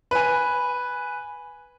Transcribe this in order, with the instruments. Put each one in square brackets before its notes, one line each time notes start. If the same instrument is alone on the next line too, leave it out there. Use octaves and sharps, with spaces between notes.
[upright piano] B4 G#5